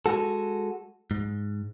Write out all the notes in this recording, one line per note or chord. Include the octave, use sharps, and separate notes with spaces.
G#3 F#4 A4
G#2